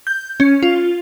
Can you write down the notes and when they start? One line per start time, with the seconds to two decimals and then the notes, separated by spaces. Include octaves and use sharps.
0.07 G6
0.40 C#4
0.63 F4